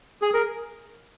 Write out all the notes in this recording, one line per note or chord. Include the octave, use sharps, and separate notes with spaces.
G#4
A#4